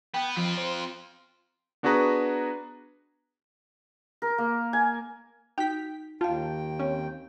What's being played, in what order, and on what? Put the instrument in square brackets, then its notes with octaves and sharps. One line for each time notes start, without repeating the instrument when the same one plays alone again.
[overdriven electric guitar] B3 [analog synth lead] G5
[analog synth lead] F3 [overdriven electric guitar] C4 F4
[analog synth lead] C5
[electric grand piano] B3 D4 F#4 G#4 B4 A#5
[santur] A#4
A#3
G#5
[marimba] D#4 F#4 [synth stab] G5 B6
[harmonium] D#2 G5 [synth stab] F4 [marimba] F5 A5
[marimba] C4 [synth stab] C#4